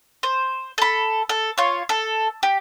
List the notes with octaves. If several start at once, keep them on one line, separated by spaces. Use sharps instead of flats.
C5
A4 B5
A4
F4 C#5
A4
G4